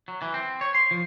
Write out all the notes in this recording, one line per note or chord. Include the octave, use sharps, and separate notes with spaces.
F#3
E3
C4
C#5
C6
F3